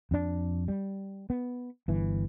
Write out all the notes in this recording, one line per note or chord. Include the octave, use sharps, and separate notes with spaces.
F2 D4
G3
B3
G1 E3